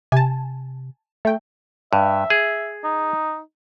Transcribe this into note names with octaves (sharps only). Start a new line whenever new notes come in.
C3 G#5 A5
A3 G5
G2 E5
G#4
D#4